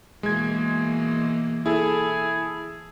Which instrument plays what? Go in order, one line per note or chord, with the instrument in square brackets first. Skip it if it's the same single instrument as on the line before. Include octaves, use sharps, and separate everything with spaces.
[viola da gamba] B2 E3 A#3 [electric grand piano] G#3 G#6
[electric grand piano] E4 A4 [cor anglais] G#4